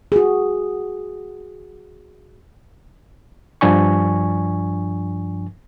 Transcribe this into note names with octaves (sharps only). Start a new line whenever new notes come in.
F#4 G#4
G2 F3 D4 G#5 C#6